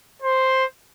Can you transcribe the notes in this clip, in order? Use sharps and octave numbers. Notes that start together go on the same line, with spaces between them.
C5